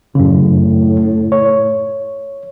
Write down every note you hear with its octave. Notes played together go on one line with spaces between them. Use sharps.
F#2 A2 C#3
C#5